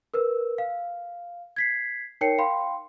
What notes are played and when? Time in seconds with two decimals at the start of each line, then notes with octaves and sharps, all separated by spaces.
0.14 A#4 B4 E6
0.58 F5
1.56 G#6 B6 C7
2.21 D#4 A#4 C#5 G5 C7 C#7
2.38 F5 G5 B5 C6